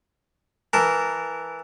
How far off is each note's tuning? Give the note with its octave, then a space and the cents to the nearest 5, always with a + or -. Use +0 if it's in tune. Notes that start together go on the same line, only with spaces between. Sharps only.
E3 +0 A#4 -10 A5 +0